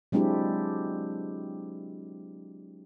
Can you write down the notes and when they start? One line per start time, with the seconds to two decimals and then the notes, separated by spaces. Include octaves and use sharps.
0.12 F#3 G#3 C4 D4 E4 G4